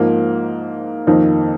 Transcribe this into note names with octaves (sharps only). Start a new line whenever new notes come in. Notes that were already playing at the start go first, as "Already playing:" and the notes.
Already playing: G#2 F3 A#3
F2 D#3 A#3 D#4